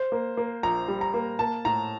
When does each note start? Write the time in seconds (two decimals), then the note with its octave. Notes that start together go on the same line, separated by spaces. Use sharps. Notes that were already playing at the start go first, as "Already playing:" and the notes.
Already playing: C5
0.12 A#3
0.37 A#3
0.63 A#1 A#5
0.88 G3
1.01 A#5
1.14 A#3
1.39 A#3 A5
1.65 A2 A#5